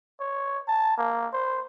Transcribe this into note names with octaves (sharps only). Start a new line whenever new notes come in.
C#5
A5
A#3
C5